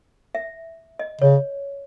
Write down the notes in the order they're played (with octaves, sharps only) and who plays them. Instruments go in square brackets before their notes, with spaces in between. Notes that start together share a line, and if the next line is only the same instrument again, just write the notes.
[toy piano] E5
D#5
[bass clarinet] C#3 [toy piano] C#5